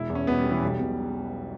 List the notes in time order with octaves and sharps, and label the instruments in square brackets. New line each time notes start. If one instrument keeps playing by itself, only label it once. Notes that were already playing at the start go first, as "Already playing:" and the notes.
Already playing: [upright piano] E1 [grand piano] E4
[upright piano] E2
[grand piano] C#4
[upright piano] B2 [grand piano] B3
[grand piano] G3
[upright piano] E1
[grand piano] E3
[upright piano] B1 [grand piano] G3
[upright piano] B2